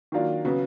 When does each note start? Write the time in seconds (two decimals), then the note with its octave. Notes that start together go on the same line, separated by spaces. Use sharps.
0.12 D#3 F#3 A#3 D4 F4
0.45 C#3 F#3 B3